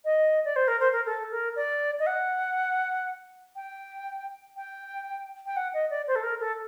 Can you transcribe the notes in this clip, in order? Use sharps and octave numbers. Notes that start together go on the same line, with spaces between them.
D#5
D5
C5
A#4
C5
A#4
A4
A#4
D5
D#5
F#5
G5
G5
G5
F#5
D#5
D5
C5
A4
A#4
A4